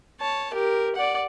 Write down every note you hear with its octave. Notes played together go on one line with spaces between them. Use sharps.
C#5 A5
G4 A#4
D5 F#5